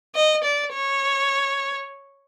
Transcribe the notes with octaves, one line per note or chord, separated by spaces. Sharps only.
D#5
D5
C#5